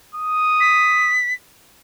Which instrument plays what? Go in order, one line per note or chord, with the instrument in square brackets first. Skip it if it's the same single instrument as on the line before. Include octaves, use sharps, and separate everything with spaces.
[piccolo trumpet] D#6
[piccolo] B6